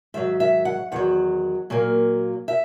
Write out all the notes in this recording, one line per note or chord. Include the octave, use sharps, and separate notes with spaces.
G#2 D#3 F#3 E5
E5
F#5
E2 D#3 F#3 F#5
A#2 F#3 A#3
E5